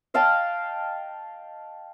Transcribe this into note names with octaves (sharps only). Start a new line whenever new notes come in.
D#5 F5 G5 A5